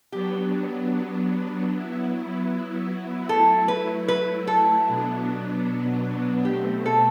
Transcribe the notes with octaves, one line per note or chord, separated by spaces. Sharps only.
F#3 B3 D4 G4
F#3 B3 E4
F#3 A3 E4 A4
B4
B4
A4
B2 F#3 B3 D4
B2 A3 C4 G4
A4